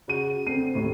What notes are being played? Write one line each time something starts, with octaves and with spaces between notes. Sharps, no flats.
C#3 F#4 D#7
D3 C4 C7 D#7
D#2 A2